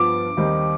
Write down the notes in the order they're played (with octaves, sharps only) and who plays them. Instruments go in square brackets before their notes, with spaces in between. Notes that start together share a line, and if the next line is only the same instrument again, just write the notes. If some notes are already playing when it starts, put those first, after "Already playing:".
Already playing: [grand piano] G2 F3 B3 F4 [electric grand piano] D6
[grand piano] D#2 D#3 G3 C4 D#4